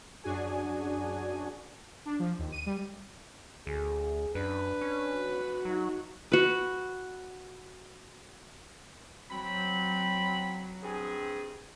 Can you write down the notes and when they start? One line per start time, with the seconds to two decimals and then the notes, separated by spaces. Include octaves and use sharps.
0.23 F#2 D4 F#4 G#4 G#5
2.06 D4
2.19 F3
2.39 D#2
2.52 D#7
2.66 G3
3.67 D2 G#4
4.35 F#2 D4 B4
4.81 C#4
5.17 F#4
5.65 F#3 D#4
6.32 F#4 B4
9.30 F#3 C4 B5
10.83 G2 C4 G#4